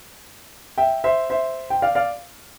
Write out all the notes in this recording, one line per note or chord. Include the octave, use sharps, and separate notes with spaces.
E5 G5
C5 E5
C5 E5
G5
D5 F5
D5 F5